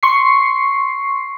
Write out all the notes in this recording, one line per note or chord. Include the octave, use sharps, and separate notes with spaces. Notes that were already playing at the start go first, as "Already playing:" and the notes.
C6 C#6 C7